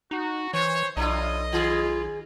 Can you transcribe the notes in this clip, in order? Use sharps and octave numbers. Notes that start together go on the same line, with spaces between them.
D#4 F#4
E3 C5 C#5
B1 D4 E4 F4 D#5
D#3 F4 G#4